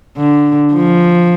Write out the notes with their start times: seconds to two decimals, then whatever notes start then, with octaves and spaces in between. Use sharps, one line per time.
0.18 D3
0.75 F3